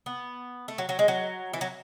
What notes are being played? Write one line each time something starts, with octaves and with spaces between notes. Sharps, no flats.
B3
A3
F#3
F#3
G#3
F#3
E3
F#3